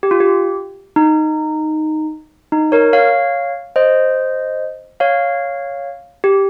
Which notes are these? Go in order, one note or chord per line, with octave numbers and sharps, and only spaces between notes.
G4
F4
G4
D#4
D#4
A#4 C#5
C#5 F5
C5 D#5
C#5 F5
G4